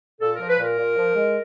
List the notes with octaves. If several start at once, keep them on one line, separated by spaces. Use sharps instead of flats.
A#2 A4
A#4
F3
B4
A#2 A#4
A#2
F3
G#3